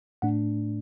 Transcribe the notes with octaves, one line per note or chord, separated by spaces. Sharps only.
A2 A3 D4 F#5